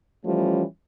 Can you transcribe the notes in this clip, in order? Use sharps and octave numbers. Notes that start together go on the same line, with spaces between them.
E3 F3 G3 A3 C#4